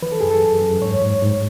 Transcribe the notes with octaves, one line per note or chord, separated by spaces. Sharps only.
E3 B4
A4
F#2 G#4
A4
F#2
F#2
G#2 C#5
G#2
G#2